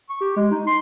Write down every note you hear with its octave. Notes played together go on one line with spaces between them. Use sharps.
C#6
G4
G#3
D#4
C6